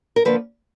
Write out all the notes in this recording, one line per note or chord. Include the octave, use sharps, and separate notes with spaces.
A#4
D3 F3 A#3 B4